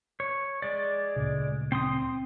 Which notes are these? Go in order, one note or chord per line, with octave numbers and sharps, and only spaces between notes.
C#5
G#3 D5
D2 A#2 C#3
C4 C6 D#6